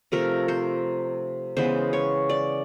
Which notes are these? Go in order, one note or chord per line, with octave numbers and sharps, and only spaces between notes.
C3 F3 A3 A#4
C5
C#3 E3 G#3 B3 C5
C#5
D5